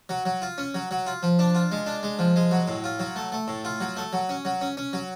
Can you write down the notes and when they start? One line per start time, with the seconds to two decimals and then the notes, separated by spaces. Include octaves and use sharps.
0.09 F#3
0.25 F#3
0.42 F4
0.58 C#4
0.74 F#3
0.91 F#3
1.07 F4
1.23 F3
1.39 D4
1.55 F4
1.72 G#3
1.86 D4
2.03 G#3
2.19 F3
2.36 G#3
2.51 F#3
2.68 A2
2.84 F4
2.99 F#3
3.16 A3
3.32 A3
3.48 A2
3.65 F4
3.81 F#3
3.97 A3
4.13 F#3
4.29 C#4
4.45 F#3
4.61 C#4
4.77 C#4
4.93 F#3